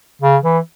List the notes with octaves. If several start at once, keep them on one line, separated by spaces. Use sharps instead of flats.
C#3
E3